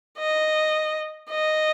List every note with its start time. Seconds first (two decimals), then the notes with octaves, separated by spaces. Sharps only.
0.18 D#5
1.30 D#5